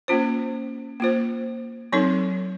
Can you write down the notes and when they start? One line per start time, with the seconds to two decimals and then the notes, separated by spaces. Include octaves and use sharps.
0.08 A#3 C#4 F4 C5
1.00 A#3 F4 C5
1.93 F#3 C4 D#4 A4 C#5